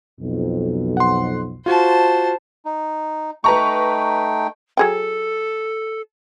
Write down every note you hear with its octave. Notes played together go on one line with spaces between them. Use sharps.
B1 F2
F#5 C6
F4 F#4 C5 A5
D#4
A3 D#4 B4 G5 A#5 C#6
F#3 G#4 A4 G5